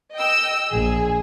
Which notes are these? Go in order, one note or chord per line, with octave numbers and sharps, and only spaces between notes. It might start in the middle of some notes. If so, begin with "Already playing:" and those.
D#5 G5 E6
A#1 G#4